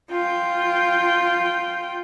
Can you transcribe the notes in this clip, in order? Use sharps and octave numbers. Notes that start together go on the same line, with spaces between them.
F4 G5